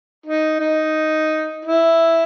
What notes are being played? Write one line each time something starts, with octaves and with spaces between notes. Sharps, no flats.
D#4
D#4
E4